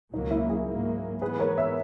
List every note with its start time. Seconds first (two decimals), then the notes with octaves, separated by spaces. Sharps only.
0.13 C#2 B2 F#3 A#3 D#4
0.31 E4
0.49 E4 G#4
0.68 G#2 F#3 A#3
1.21 G#2 E3 B3 G#4 B4
1.39 A#4 C#5
1.58 C#5 E5